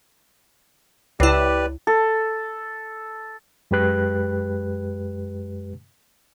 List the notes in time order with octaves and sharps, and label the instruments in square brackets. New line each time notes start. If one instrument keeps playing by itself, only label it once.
[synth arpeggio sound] C#2 E4 [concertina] G4 B4 D5
[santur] A4
[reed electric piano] F#2 G#3 G4 B4 F#6